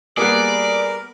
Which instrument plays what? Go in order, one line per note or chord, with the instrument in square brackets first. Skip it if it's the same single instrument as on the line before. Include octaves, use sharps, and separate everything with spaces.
[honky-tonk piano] G3 A#3 B3 [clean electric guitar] G#4 F#5 [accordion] A#4 [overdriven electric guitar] D5